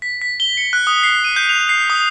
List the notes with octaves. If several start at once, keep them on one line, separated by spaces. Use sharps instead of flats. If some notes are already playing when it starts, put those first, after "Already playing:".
B6
B6
G7
C#7
F#6
D#6
C7
D#7
G6
F7
C7
D#6